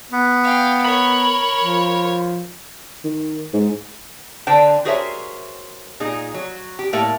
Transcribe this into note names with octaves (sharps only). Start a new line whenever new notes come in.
B3
F5 G5
A#4 C#5 B5
F3
D#3
G#2
D3 D4 C5 G5 A5
F#4 G#4 A#4 C5 C#5 E5
A#2 D#4 G#4
F#3
G4
A2 A3 A#3